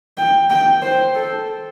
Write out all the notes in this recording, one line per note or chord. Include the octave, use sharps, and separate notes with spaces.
G5
G5
C5
A4